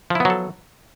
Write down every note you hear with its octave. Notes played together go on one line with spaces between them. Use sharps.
F3 F#3 B3 E4 A4